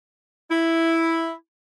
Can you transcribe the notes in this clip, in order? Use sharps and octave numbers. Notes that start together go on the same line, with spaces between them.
E4